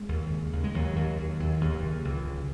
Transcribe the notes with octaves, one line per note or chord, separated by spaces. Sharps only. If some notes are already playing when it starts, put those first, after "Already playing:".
Already playing: G#3
D#2
C#3
D#2
G#3
D#2 F#3
D#2
D#2
D#2
D#2
C#3
C#2
C#3